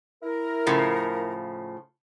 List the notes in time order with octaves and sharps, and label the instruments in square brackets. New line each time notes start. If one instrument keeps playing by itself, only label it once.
[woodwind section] E4 A#4
[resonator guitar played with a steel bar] A2 C#3 F3